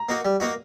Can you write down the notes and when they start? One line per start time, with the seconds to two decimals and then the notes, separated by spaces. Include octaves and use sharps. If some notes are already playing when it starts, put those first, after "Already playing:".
Already playing: A#5
0.09 A#3 D#4 F#4
0.25 G3
0.40 A#3 D#4 F#4